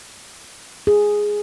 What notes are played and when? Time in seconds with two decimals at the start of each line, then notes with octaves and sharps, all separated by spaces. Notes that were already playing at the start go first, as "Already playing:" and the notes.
0.87 G#4